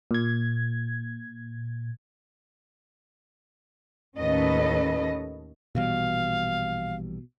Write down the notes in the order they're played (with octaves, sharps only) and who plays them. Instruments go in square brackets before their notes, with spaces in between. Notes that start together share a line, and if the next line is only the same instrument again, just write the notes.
[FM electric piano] A#2 G#6
[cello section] D#2 A2 C#4 A4 B4 D#5
[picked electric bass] A#1 E3 G3 [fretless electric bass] B2 [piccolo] F5